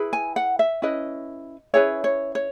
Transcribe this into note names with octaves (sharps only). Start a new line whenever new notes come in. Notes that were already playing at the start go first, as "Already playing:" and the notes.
Already playing: E4 G#4 B4
G#5
F#5
E5
C#4 E4 B4 D#5
C#4 E4 G#4 B4 C#5
C#5
C#5